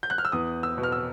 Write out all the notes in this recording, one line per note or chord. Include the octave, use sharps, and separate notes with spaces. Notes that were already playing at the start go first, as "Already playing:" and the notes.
G6
F#6
F6
E6
E2 D#6
E6
B2
F6
E6